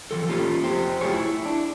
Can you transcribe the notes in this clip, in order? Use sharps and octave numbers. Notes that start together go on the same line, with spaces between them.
E3 F3 A4
A3 A#3 C#4 F4 G4
F2 G4 C5
A3 F4 G4 G#4 C#5
E4
D4